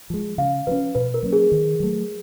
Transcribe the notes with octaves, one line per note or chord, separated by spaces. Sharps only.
F3 G#3
C#3 F5
F3 A3 C#4 B4
B2 B4
A#4
F#3 A#3 C#4
G#4
D#3
F#3 A3